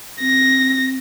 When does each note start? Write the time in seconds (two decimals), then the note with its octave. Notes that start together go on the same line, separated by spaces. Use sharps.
0.20 C4 A#6